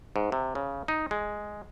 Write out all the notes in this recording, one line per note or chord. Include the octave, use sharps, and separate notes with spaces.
G#2
C3
C#3
D#4
G#3